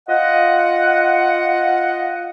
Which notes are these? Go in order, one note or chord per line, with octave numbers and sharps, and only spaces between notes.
F4 D#5 F#5